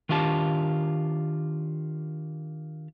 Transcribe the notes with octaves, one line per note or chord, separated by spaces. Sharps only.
D#3 D4 F4 G4 A5